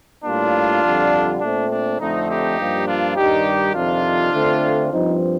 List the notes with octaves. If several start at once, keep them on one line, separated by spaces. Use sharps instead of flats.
A2 G3 A#3 D4 F4
F2 D3 G3
A#2 A3 C4 D4
D4
F2 D3 A3 C4 D#4
D#4 G4
G2 F3 A#3
D4 F4
G2 D#3 G3 D#4 G4
F2 C3 D#3 D4 F4
D3 A3 C4
G2 F3 C4 D#4